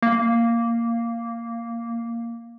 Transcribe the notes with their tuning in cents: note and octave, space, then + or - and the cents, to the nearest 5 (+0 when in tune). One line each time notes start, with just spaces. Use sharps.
A#3 -5